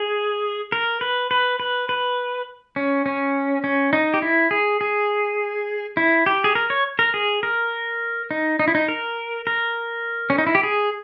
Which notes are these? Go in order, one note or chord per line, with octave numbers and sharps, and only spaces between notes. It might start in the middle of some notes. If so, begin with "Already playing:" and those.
Already playing: G#4
A#4
B4
B4
B4
B4
C#4
C#4
C#4
D#4
G4
E4
G#4
G#4
E4
G4
G#4
A#4
C#5
A#4
G#4
A#4
D#4
D#4
E4
D#4
A#4
A#4
C#4
D#4
E4
G4
G#4